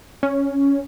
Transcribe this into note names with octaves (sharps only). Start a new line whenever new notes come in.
C#4